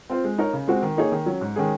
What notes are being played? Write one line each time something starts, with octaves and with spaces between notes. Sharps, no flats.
C4 F4 C5
G#3
D#4 A#4 C#5
C#3
G#3 C4 F#4
D#3
A#3 D#4 G#4 C#5
D#3
F#3 C#4
G#2
D#3 G#3 C#4 G#4